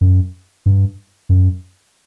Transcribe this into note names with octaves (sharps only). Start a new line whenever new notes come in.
F#2
G2
F#2